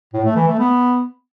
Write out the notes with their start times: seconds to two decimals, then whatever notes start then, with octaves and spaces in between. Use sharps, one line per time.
0.13 A2
0.25 A3
0.36 E3
0.48 A3
0.59 B3